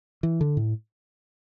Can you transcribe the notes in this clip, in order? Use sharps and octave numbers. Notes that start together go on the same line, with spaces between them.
E3
D3
A2